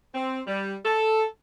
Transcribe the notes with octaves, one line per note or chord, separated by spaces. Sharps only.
C4
G3
A4